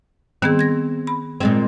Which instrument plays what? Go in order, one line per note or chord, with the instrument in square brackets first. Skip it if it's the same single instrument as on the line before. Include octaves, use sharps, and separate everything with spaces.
[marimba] D#3 B3 G#4 [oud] C4
[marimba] G#6 A#6
B5
[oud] A#2 G#3 C4